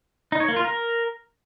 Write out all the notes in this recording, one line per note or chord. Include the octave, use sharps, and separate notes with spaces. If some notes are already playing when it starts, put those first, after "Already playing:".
D#4
C#5
A#3
F4
A#4